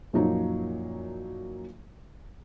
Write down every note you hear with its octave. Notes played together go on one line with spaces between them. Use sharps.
F#2 A#2 F3 F#3 D#4